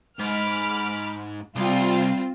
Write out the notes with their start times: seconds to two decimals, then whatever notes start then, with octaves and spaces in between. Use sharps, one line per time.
0.19 G#2 B5 D6 F6
1.56 C2 G3 C4 F4